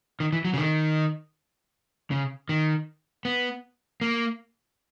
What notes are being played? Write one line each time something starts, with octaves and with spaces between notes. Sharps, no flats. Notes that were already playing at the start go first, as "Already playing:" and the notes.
D#3
E3
F#3
C#3
D#3
C#3
D#3
B3
A#3